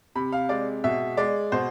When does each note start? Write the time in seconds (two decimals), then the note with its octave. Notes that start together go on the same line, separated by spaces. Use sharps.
0.15 C3 B5
0.32 F5
0.49 G#3 D5
0.84 B2 E5
1.17 G#3 D5
1.52 B2 C5